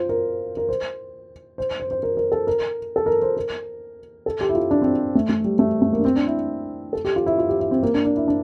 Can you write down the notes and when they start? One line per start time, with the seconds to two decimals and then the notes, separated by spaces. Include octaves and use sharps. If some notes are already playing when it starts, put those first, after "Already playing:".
Already playing: F4 C5
0.09 A#4
0.57 A#4
0.69 C5
1.58 C5
1.80 C5
1.91 C5
2.03 A#4
2.17 A#4
2.32 A4
2.47 A#4
2.96 A4
3.06 A#4
3.22 C5
3.37 A#4
4.26 A4
4.41 G4
4.49 E4
4.55 F4
4.71 D4
4.82 C4
5.15 A3
5.29 A3
5.44 G3
5.59 A3
5.82 A3
5.93 A#3
5.99 D4
6.05 C4
6.16 D4
6.27 E4
6.93 A4
7.05 G4
7.16 F4
7.26 E4
7.38 F4
7.49 G4
7.60 E4
7.71 C4
7.83 A#3
7.94 D4
8.05 D4
8.17 E4
8.28 D4